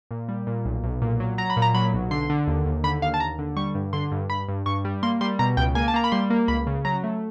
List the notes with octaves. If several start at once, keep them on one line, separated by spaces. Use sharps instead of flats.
A#2
G3
A#2
B1
B1
A#2
F#3
F#3 A#5
B5
A#2
A#5
F#3 B5
B1
D3 C6
D3
D#2
D#2
D3 B5
D#2 F5
A5
D#2 A#5
D3
G3 C#6
G2
D3 C6
G2
G2 B5
G2
G2 C#6
G3
A#3 C6
G3 C6
B2 A#5
C#2 G5
A#3 G#5
A5
A#3 A#5
B5
G3 C6
A#3
C#2 B5
C#3
F#3 A#5
A3